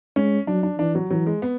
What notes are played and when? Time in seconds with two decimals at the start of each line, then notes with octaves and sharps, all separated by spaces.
0.16 G#3 C#4
0.47 F#3 D4
0.63 D4
0.79 E3 D4
0.95 F#3
1.10 E3 F#3
1.27 G#3
1.42 B3